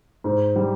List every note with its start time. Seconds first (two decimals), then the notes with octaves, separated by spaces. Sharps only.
0.24 G#2
0.56 G3